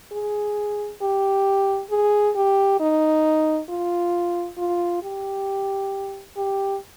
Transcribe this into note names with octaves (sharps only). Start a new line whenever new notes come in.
G#4
G4
G#4
G4
D#4
F4
F4
G4
G4